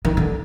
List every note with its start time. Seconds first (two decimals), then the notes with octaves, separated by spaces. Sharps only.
0.05 D#3
0.17 D3